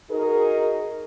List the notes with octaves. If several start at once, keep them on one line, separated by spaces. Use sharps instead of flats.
D#4 F#4 G#4 A#4